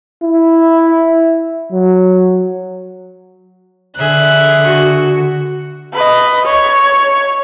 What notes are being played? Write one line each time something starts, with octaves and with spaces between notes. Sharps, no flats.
E4
F#3
D3 G#4 E5 F#6
F#4
B4 D#5
C#5